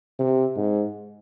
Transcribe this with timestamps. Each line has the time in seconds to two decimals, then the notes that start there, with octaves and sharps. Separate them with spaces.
0.19 C3
0.56 G#2